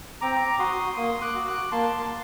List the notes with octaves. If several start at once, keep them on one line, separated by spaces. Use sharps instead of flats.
C4 A#5 D6
F#4 C6 D#6
A#3 C6 D#6
D6 F#6
F#4
D6 F#6
A#3 A5 C6
C6